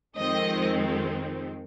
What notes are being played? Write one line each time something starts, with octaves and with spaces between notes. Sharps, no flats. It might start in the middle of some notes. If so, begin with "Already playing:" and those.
F2 D#3 G#3 C4 D#5